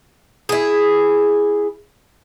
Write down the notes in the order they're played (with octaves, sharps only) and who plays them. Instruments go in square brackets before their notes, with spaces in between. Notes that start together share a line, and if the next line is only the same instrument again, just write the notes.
[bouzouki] E4 G#4